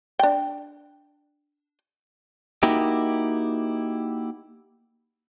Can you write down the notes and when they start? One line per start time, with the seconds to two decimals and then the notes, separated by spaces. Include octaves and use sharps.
0.19 D4 G5
2.63 A#3 D#4 E4 F#4 G4